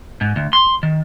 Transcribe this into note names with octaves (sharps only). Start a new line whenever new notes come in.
G#2
D2
C6
D#3